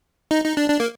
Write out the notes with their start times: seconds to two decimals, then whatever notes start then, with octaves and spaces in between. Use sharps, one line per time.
0.31 D#4
0.44 D#4
0.57 D4
0.70 D4
0.80 A#3